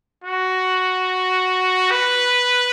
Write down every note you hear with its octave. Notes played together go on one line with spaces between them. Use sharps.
F#4
B4